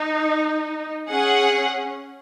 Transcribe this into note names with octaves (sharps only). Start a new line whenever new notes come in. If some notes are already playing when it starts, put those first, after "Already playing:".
Already playing: D#4
C#4 G#4 F#5